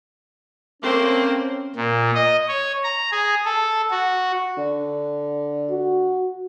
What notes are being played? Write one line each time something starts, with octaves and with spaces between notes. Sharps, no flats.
A3 A#3 C4 C#4 C5
A#2
D#5
C#5
A#5
G#4
A4
F#4
D3
F#4